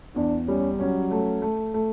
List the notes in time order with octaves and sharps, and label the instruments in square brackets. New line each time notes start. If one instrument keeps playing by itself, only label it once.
[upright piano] E2 [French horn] D4
[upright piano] G3 [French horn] C#4
[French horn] F#3 [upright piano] C#4
[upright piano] A3
A3
A3